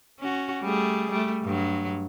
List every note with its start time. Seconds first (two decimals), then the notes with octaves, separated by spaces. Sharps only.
0.20 C#4 F#4
0.62 G3 A3 G#4
1.11 G3 A3
1.44 G2 F#3